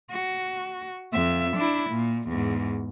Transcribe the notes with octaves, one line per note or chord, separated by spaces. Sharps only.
F#4
F2 E5
D4 E4
A#2
E2 G#2